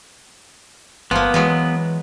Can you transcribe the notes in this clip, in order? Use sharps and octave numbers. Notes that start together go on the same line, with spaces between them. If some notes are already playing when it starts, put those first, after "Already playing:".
G1 F3 A#3 B3
E3 F#3 G#3 B4